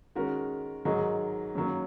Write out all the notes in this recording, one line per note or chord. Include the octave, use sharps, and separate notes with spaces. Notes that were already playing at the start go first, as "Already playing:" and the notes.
D#3 G#3 C#4 F#4 A#4
G#2 D#3 F#3 D#4 G#4
F#2 D#3 F#3 A#3